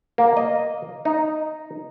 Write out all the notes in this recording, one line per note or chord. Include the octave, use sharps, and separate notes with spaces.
A#3
D#5
D#4